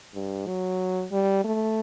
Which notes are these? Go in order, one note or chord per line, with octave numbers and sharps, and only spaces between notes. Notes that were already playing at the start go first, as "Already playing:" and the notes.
G2
F#3
G3
A3